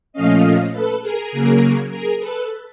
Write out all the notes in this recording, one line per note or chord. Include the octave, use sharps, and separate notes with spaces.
A#2 F3 A3 C#4 D#5 F5
A4 B4
G#4 A#4
C#3 F#3 A#3
G#4 A#4
A4 B4